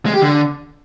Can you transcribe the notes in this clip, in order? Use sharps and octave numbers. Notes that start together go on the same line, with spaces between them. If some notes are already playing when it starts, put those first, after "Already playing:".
G#3
G4
D3